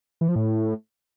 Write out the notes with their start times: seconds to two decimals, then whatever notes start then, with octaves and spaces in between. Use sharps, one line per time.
0.21 E3
0.28 F3
0.36 A2